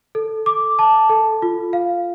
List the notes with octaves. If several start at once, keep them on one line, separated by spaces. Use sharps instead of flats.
A4
D6
A5
A4
F4
F5